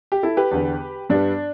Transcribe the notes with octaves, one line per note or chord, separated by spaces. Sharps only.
G4
E4 A4
G4 B4
E2 D3 B3
G2 G3 B3 D4